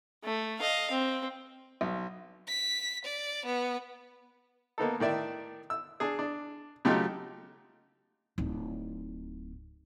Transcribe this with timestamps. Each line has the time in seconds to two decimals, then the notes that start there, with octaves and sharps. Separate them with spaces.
0.24 A3
0.59 D#5 F5
0.91 C4
1.81 B1
2.48 B6
3.05 D5
3.46 B3
4.78 A#3 B3 D#4 A4
5.00 A2 D#3 D5 E5
5.70 E6
6.00 D4 G#4
6.19 D4
6.85 C#3 F#3 A3 D#4 F4 G4
8.38 D1 D#4